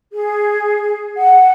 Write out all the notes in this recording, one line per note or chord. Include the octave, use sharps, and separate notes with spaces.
G#4
F#5